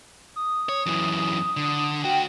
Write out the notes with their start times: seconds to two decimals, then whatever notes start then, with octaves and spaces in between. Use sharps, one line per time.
0.36 D#6
0.69 C#5
0.86 F#2 E3
1.57 D3
2.04 D3 F#4 G5